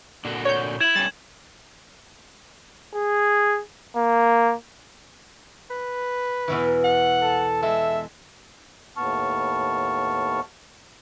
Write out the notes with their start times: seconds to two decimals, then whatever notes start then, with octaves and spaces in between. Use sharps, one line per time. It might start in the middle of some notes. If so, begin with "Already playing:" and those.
0.25 A#2 D3 F#4
0.45 C#5 G6
0.81 E4 E5 G#6 E7 F#7
0.95 G3 A3 C#4 A6
2.95 G#4
3.96 A#3
5.71 B4
6.48 E2 B2 E3
6.84 F#5
7.22 A4
7.62 G#3 A4 E5
8.97 D#2 A2 B3 A5 C#6 F6